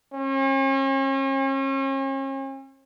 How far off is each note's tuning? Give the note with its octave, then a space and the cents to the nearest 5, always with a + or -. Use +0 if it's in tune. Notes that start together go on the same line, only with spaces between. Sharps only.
C#4 -40